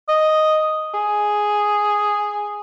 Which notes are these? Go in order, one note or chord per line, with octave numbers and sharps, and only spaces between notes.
D#5
G#4